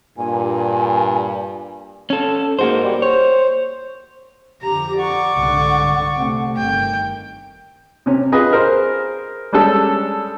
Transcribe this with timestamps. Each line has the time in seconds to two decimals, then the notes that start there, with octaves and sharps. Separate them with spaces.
0.18 G2 A#2 G#5
2.10 C#4 A4
2.59 G#2 A#3 F#4 C5
2.84 G3
3.02 C5 C#5
4.63 F2 D3 G4 A#5
4.97 D5 F#5 C#6
5.33 C2 G#2 D3
6.18 C3 A3 C4
6.57 G1 D#3 G5
8.06 C3 C#4
8.32 F4 G#4 B4 D#5
8.51 G#4 A#4 C5
9.53 G3 G#3 C#4 D4 A4